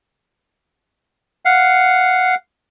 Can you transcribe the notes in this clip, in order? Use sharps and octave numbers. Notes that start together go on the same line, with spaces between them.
F5 F#5